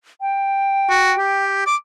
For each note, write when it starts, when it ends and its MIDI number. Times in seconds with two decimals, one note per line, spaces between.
0.21 1.45 79
0.90 1.13 66
1.19 1.65 67
1.67 1.76 86